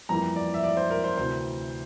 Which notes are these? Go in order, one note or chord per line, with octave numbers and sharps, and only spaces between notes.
F2 E3 G3 A#3 A#5
D5
E5
D5
C5
A#4
C5
D2 C3 E3 C5